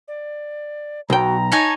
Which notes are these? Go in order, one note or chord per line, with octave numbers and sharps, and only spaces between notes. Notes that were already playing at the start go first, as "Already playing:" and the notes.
D5
B1 F#4 G5 A#5
D#4 C#5 G#5 A5